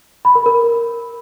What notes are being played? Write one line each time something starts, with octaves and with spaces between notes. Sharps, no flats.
B5
A#4
A#4